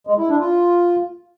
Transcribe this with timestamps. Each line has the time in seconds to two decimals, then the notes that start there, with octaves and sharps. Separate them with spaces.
0.07 G#3
0.18 E4
0.29 D4
0.40 F4